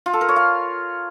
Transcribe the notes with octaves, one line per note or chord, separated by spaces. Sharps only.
F4
A4
A#4
C#5
F5